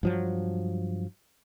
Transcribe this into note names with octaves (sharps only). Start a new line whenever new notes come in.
G2 F3 F#3